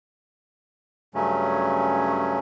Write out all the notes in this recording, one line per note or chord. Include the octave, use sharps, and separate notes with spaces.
G2 C#3 F#3 A3 C#4